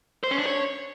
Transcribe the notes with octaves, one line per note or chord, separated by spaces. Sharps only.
C5
C#4
D4
C#5